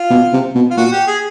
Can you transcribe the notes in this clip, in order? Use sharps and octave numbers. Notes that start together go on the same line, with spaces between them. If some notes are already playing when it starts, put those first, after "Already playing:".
Already playing: F4
B2
C3
B2
F4
A#2 F#4
G4
G#4